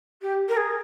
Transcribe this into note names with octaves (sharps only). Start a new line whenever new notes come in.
G4
A#4
G#4